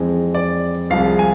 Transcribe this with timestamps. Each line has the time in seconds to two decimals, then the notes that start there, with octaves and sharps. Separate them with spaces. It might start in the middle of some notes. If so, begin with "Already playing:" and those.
Already playing: F2 E3 G#3
0.35 D5
0.90 C2 C3 F3 G#3 F5
1.19 G#5